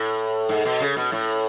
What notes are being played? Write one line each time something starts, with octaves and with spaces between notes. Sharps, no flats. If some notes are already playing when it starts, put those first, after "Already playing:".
Already playing: A2
G#2
B2
C#3
B2
A2